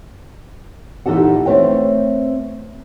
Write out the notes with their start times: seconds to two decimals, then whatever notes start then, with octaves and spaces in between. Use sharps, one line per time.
1.06 A#2 E3 D#4 G4 A4 F#5
1.46 A3 C4 B4 C#5 G5